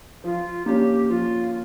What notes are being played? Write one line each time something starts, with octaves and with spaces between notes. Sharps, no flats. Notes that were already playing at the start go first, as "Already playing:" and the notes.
F3 F4
A#3 C#4 G4
F3 F4